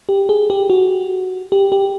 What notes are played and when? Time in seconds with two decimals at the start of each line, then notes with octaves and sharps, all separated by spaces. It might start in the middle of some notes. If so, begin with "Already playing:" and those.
0.09 G4
0.29 G#4
0.50 G4
0.70 F#4
1.52 G4
1.72 G4